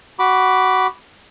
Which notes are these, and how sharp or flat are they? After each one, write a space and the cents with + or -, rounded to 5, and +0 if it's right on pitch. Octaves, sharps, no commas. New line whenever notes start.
F#4 +15 B5 +0 D6 +0